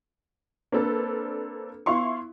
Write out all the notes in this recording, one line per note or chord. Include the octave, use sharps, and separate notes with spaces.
A#3 C4 D4 A4 B4
B3 E4 F5 C6 C#6